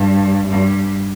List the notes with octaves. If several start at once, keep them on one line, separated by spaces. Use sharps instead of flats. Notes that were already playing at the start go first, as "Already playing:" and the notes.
Already playing: G2
G2